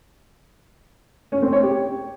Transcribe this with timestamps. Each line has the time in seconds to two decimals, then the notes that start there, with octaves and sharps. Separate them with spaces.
1.32 C#4
1.42 C4
1.53 C#5
1.63 G4